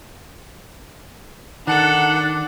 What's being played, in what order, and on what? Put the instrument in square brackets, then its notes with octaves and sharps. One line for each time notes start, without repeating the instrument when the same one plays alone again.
[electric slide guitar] D#3 [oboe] D4 [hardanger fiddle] A4 [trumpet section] F#5